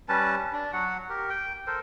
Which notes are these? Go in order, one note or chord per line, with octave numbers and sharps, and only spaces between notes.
G3 C#4 B4 A5
D4
F#3 F#4 F#5
G4 A#4
G5
A4 A#4 C5